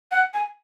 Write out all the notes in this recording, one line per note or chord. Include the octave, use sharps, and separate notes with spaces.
F#5
G#5